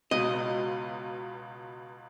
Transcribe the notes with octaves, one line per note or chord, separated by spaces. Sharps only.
C#2 B2 D#5